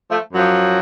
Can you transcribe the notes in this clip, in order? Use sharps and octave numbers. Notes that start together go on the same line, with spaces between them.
F3 A3
F#2 F3 F#3